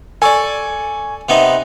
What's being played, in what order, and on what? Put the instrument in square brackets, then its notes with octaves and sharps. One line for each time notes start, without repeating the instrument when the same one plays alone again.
[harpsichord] A4 D5 [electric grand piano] G#5 C#6
[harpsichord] C3 B3 D#4